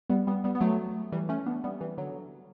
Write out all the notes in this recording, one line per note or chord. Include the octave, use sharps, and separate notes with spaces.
G3 B3
G3 B3
G3 B3
B3
F#3 A3
E3 G3
A3 C#4
B3 D4
G3 B3
E3 G3
D3 F#3